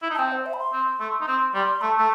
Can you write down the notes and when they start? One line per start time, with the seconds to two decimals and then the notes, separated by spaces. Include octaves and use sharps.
0.02 E4
0.10 D#4
0.15 A5
0.18 C4 G5
0.32 C5
0.46 E5
0.53 B5
0.59 C6
0.73 C4
1.00 A3
1.21 D#4
1.27 C4 C6
1.53 G3 C6
1.81 A3 A5
1.98 A3